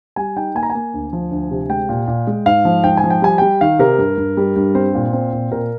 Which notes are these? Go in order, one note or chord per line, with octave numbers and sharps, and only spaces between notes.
G3 G#5
D#4 G5
A#3 G#5
A#5
G#5
A#3
D2
F3
D2
C3
G#3 G5
A#2
A#2
G#3
G#2 F5
F3
G#2 G5
G#5
F3
G5
G3 G#5
G3 G5
D#3 F5
C3 A#4
G2
G2
G3
G2
C4 C5
A#2
C4
A#2
A#2 A#4